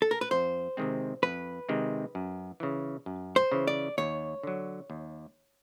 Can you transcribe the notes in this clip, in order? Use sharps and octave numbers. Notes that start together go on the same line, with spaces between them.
A4
A#4
B4
F2 C5
C3 D#3 G#3 C4
F2 B4
C3 D#3 G#3 C4
F#2
C#3 E3
F#2
C5
C#3 E3
D5
D#2 C#5
D3 F#3
D#2